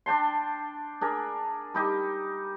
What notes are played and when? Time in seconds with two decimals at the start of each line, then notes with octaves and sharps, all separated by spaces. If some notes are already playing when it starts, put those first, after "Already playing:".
0.06 D4 G5 A5 C6
1.01 D4 G#4 A#4
1.74 G3 D#4 G4